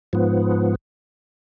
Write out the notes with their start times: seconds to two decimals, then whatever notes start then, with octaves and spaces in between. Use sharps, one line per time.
0.13 G#2 F3 B3